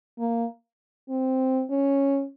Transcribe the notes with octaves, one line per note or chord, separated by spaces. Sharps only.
A#3
C4
C#4